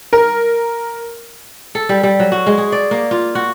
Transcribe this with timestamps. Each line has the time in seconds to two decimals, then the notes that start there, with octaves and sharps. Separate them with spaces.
0.13 A#4
1.75 A4
1.89 G3
2.03 G3
2.20 F#3
2.32 F#4
2.47 G#3
2.58 G#4
2.72 D5
2.91 A#3
3.11 F4
3.35 F#4